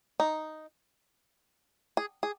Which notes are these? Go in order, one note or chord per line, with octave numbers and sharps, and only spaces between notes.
D#4
G#4
G#4